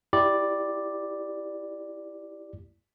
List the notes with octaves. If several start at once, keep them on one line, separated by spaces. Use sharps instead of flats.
E4 G4 D5